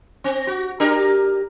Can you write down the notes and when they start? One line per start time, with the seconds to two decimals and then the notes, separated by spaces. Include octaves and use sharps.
0.24 C4
0.47 F#4
0.80 D4 G4 A#4